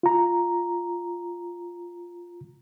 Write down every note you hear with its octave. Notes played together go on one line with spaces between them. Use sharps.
F4 A#5